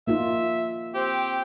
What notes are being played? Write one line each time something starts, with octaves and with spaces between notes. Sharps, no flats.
A#3 D#4 F4 E5
C4 G4